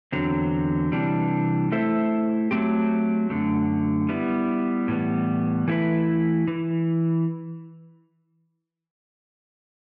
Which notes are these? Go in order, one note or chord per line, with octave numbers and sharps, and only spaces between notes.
E2 D3 F#3 C4
C3 E3 G3 D4
A3 E4 A4 C5 E5
F#3 A3 C4 G4
F#2 D3 A3
G3 B3 E4
A2 E3 G3 B3
E3 A3 E4 B4
E3